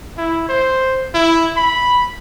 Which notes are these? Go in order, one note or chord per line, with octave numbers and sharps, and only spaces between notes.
E4
C5
E4
B5